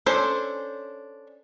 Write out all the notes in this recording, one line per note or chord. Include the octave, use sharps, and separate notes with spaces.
C#4 D4 A4 C5